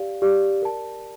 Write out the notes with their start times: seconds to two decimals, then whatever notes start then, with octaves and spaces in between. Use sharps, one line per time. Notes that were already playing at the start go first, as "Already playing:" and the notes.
Already playing: G4 D5 F5
0.22 G4 D5 F5
0.62 A#4 D5 A5